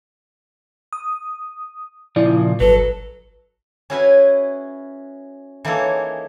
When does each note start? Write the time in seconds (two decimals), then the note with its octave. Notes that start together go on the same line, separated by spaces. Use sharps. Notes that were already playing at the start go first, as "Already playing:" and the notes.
0.93 D#6
2.16 A#2 C#3 F3 E4 D5
2.60 G#1 F#3 A4 B4
3.90 C#4 E4 F#4 G#4 B4 G#5
5.65 E3 A#3 D#4 G#4 A4 C#5